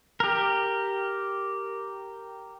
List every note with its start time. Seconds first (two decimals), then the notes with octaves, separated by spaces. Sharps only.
0.20 G4 A#4